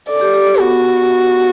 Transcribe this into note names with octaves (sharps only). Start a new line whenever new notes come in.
A4 D5
G4
G4
G4
B3 F#4